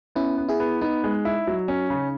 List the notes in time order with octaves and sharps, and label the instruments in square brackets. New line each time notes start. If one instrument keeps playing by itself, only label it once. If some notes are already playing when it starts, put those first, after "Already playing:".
[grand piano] B3 [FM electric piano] C#4 E4
[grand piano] B3
[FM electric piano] E4 G#4
[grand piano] B3
[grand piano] B3 [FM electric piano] D#4
[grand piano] G#3
E4
F#3
C#4
C#3